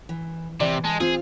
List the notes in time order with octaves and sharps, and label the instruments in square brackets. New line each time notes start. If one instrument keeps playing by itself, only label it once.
[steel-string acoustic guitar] E3
[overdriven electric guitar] C3 [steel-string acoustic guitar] E3 [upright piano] D5
[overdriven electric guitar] G#3 [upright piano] A5
[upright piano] C4 [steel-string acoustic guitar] F4 F5 [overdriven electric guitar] G#4